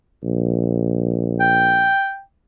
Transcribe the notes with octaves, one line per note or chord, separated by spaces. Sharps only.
A#1
G5